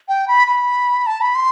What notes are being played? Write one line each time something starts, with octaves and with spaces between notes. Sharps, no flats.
G5
B5
B5
A5
B5
C6